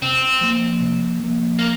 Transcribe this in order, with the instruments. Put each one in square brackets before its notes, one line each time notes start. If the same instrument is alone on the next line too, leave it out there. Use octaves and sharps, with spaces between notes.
[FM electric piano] C3 [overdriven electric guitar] C4
[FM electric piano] F3 A#3
C3
F3 A#3
[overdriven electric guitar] A#3